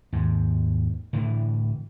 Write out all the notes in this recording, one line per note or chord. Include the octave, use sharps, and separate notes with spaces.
D#2 G#2
A2 D3 E3